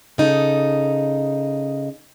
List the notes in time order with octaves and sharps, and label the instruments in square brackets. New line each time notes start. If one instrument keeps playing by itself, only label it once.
[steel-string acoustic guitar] C#3 D#4 A4